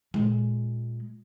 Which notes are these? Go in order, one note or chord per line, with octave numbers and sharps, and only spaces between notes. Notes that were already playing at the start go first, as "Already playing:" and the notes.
A#2 G#3